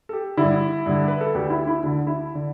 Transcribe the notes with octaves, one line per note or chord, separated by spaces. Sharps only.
A4
G4
D3 E4
G2
G2 D3
B4
A4
D2 D3 G4
E4
E4
D2 D3 D4
E4
D3